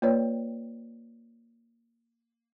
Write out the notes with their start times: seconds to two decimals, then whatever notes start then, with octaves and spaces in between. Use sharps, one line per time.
0.02 A#3 F4 B4 C#5 D5 G5